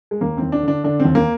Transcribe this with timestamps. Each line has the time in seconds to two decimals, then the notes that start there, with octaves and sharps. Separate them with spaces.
0.11 G#3
0.21 D#2 A#3
0.37 D#2 C4
0.52 D4
0.63 D3 D4
0.84 D3 D4
1.00 C4
1.05 D#2
1.15 A#3